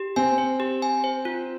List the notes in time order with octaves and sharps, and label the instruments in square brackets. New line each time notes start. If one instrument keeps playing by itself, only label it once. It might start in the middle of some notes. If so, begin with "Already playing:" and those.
Already playing: [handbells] G4
[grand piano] C4 [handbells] G#5
[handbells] C5
G4
G#5
C5
F4